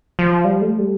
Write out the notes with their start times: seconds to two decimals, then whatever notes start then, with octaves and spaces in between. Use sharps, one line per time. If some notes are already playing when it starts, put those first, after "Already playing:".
0.19 F3
0.45 G3
0.61 A3
0.79 G3